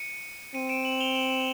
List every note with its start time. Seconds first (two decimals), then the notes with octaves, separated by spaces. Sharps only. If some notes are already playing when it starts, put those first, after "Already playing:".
Already playing: C#7 D#7
0.54 C4 C#7 D#7
0.69 D7 E7
0.85 E7 F#7
1.00 F7 G7
1.15 E7 F#7
1.30 E7 F#7